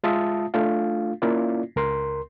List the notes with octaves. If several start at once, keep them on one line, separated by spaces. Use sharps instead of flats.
G#3 F4 E5 A5 D#6
A3 D4 F4 F5
A#3 C#4 E4 F4 D5
C#2 A#4 C6